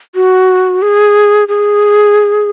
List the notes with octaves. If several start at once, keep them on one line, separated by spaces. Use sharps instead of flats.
F#4
G#4
G#4